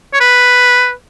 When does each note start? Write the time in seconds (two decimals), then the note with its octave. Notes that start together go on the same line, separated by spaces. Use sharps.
0.14 C#5
0.21 B4